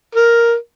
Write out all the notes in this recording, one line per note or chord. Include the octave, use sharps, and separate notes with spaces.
A#4